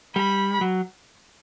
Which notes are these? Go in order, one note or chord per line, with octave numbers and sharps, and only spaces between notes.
G3 B5
F#3